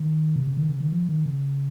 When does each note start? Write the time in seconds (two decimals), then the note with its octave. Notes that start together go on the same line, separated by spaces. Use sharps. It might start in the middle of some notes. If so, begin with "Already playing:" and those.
Already playing: D#3
0.36 C3
0.47 C#3
0.57 D#3
0.69 C#3
0.80 D#3
0.92 F3
1.09 D#3
1.26 C#3